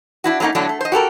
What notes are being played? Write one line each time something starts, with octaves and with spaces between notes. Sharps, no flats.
D4 E4 F#4
F#3 A3 A#3 C#4 D#4
A2 D3 F#3 A3 D4
A3
C5 D#5
F#4 G4 A4 A#4